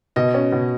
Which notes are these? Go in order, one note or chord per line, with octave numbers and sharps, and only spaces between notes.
B2 D#5
C#4
B2